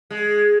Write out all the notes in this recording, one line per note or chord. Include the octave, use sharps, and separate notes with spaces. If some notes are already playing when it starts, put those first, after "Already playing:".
G#3